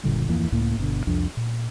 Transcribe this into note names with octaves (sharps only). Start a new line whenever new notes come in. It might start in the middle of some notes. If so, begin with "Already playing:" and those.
F#1 A#2 D3 G3
D1 F2 E3 A#3
C#2 A2 A#3
G1 B2 D3
C2 F2 D4
A#2